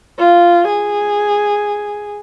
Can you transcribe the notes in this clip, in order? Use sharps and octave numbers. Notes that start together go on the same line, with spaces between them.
F4
G#4